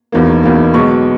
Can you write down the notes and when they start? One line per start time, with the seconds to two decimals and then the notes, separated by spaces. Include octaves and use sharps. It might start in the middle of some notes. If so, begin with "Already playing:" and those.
0.12 E1 E2 D#3 A#3
0.43 E1 E2 D#3 A#3
0.74 B1 B2 G#3 C#6